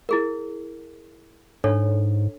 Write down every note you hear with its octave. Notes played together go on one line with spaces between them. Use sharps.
E4 G#4 A#4
G#2 D4 A4 C#5